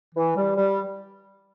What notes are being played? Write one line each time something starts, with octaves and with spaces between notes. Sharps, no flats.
E3
G3
G3